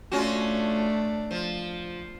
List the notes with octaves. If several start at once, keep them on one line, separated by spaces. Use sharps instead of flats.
A3 C#4 D4 F4 F#4
F3